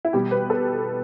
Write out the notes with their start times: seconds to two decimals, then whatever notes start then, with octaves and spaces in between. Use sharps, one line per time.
0.05 E4
0.13 B2 G3 G4
0.31 B4
0.50 A4